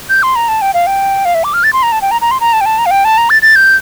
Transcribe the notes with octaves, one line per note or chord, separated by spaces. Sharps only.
G6
C6
A#5
A5
G5
F5
G5
F5
E5
D6
F6
A6
C6
A#5
A5
G5
A#5
A#5
C6
A#5
A5
G5
A5
A#5
F5
G5
A5
A#5
A6
A6
G6